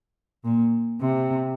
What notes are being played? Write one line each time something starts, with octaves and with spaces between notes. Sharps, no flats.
A#2
C3